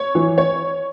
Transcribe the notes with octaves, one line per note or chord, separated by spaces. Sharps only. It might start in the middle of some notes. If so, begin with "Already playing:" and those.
Already playing: C#5
E3
C#5